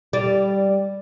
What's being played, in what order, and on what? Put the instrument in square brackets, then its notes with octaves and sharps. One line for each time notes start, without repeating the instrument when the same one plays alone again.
[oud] G3 D5